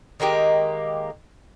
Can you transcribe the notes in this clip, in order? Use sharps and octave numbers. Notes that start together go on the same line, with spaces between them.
D#3 G#3 A#3 G4